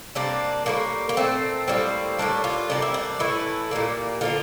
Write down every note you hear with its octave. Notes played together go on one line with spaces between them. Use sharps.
C3 G3 A#3 D4
A2 E3 G3 A#3
A#3
A#2 A3 C4
A2 G3 A#3 C4
A2 G3 A#3 D4
F4
C3 G3 A#3 D4
E4
D4
A2 E3 A3 E4
A#2 G3 A#3
D3 F3 A#3 F4